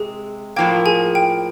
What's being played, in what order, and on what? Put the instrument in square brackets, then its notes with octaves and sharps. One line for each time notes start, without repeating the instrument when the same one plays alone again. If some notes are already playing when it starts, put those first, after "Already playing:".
Already playing: [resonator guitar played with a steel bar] C3 G#3 [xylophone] G#4
[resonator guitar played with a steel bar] A2 F3 A#3 [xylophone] G5
[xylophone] G#4 G#5
G5